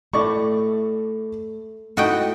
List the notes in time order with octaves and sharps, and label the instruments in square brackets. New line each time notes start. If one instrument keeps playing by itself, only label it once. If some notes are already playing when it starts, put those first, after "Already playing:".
[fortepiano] A2 D5 C#6 [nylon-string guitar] A3
[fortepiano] A3 D#4 E4 [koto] F#4 D#5 G5